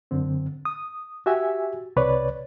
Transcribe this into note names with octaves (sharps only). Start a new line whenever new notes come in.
F#2 D3 C4
D#6
F#4 G4 E5 G#5
C2 C3 B4 C#5 D5